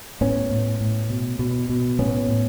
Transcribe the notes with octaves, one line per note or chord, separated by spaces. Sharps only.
A2 B3 C#4
A2
A2
B2
B2
B2
A2 B3 C#4
A2